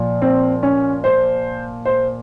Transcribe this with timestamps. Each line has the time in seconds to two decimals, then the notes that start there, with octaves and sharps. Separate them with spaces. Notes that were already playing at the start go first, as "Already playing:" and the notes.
Already playing: A#2 F3
0.22 C4
0.63 C#4
1.04 C5
1.85 C5